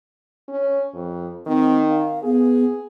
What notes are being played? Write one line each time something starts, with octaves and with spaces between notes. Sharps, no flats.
C#4
F2
D#3 C4
F5
B3 G#4